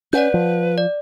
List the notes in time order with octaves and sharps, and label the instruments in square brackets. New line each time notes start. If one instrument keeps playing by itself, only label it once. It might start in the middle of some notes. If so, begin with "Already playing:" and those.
[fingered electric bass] C#4 [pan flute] B4 [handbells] D5 F#5 G6
[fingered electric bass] F3
[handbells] D5